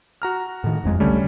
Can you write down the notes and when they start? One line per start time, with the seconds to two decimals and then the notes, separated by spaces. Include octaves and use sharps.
0.22 F#4 A#5 F6
0.64 A2 D#3
0.84 F#1 F2 G#3
1.00 C2 D3 G3 A3 C#4